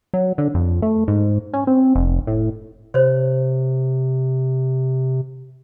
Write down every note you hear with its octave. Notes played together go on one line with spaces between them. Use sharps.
F#3
D3
F2
A3
G#2
C#4
C4
F1
A2
C3 C5 C#5